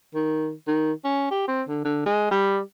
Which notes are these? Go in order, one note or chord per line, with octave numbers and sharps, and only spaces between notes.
D#3
D#3
C#4
G4
C4
D3
D3
G#3
G3